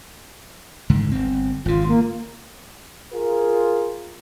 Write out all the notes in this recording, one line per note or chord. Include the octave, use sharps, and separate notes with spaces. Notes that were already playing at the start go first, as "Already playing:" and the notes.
C#2 G#2 D3
G1 C4
G#1 C#3 F4
A#3
F4 G#4 A#4